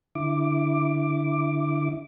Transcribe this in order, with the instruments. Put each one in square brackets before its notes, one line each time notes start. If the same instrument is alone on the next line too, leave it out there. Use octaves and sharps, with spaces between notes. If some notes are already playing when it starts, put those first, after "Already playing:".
[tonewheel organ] D3 E4 D6